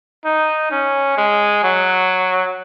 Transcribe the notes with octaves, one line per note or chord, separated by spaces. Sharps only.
D#4
C#4
G#3
F#3